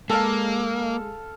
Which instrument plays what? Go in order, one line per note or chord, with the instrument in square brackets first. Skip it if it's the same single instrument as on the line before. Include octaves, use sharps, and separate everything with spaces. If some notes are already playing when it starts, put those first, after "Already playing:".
[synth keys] G#3 [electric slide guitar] A#3 [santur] A4 F5